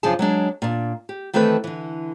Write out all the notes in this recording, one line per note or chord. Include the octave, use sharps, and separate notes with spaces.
F#2 C#3 F3 D4 G#4 A5
F#3 G#3 D4
A#2 D4
G4
D#3 E3 A3 C4 A4 B4
D3 E3